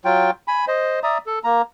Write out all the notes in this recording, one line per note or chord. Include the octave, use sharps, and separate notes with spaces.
F#3 F4 G5
G#5 B5
C5 D#5
D5 E5 A#5 D#6
A4
A#3 A#5